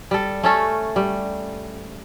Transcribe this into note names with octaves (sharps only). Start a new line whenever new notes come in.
G3 A4
A3 C#4 A4
G3